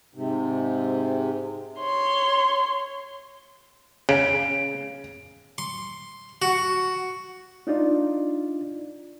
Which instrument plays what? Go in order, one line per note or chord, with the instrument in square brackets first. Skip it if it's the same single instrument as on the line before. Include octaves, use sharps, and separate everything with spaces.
[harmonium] G#2 C3
[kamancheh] C#5 C6
[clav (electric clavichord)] C#3 [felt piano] D7
[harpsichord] C6
F#4
[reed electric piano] D4 D#4 F4 D5